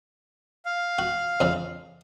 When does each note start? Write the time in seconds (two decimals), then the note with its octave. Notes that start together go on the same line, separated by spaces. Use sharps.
0.65 F5
0.99 F#4
1.40 F2 C#3